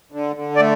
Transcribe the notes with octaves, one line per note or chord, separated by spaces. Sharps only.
D3
D3
D5
A3